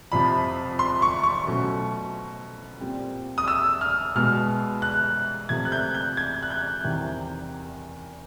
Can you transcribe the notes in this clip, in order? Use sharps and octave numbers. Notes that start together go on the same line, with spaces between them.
F2 C3 F3 B5
C6
C#6
C#6
B2 F#3 A3 C#4
A#2 G3 C4
D#6
E6
F6
B2 G#3 B3 F6
F#6
C3 F3 A3 G#6
F#6
G6
G6
G#6
F#6
G6
E2 C3 D#3 G3